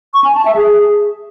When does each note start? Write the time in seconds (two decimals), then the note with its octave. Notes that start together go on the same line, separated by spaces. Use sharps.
0.14 C#6
0.24 G#5
0.35 A5
0.45 E5
0.56 G#4